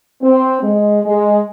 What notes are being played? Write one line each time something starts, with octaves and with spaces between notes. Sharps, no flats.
C4
G#3
G#3